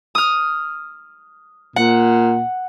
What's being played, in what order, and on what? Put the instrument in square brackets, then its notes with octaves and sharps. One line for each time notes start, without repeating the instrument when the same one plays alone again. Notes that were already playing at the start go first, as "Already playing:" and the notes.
[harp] D#6 F6
[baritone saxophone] A#2 [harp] F#5